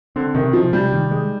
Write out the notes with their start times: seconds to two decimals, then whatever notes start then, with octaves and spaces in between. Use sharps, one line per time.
0.16 D3 C4
0.35 C3 D#3
0.53 C3 F3
0.72 C3 G3
0.92 D#3
1.11 G#3